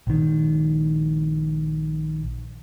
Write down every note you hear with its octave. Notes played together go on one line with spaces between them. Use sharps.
A#1 D#3